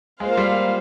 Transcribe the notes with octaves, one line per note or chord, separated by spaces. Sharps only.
G#3 A#3 F4 C5 F5
G3